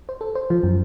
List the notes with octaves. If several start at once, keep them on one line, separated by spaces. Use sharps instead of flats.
C5
A4
C5
F3
F#2